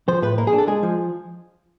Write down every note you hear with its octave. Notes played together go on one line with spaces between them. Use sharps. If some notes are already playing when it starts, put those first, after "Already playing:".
F3 C5
A2 B4
A#3 A#4
G#4
D4
A4
G#3 G#4
F3